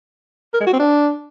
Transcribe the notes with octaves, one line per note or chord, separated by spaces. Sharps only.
A#4
G#3
F#4
C4
D4